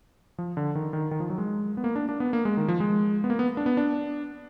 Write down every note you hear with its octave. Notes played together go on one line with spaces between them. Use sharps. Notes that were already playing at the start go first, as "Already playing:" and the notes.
F3
D3
D#3
D#3
D#3
F3
F#3
G#3
B3
A#3
D4
D4
B3
A#3
G#3
D#3
F3
G#3
B3
A#3
B3
D4
B3
D4